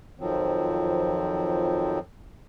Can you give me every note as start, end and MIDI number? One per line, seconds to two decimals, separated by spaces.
0.20 1.99 41
0.20 1.99 51
0.20 1.99 53
0.20 1.99 54
0.20 1.99 60